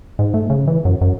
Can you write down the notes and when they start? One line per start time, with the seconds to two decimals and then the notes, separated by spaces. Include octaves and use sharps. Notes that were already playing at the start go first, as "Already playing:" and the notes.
0.19 G#2
0.34 A3
0.50 C#3
0.68 E3
0.85 F#2
1.01 F#2